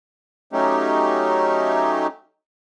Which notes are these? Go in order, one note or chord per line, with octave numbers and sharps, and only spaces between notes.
F#3 A3 C#4 D#4 G4